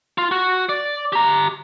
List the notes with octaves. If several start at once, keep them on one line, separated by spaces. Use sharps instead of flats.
F4
F#4
D5
G4 A#5